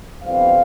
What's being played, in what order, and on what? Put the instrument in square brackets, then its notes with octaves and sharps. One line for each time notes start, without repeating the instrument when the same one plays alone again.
[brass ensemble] G1 F2 E3 G3 C4 F5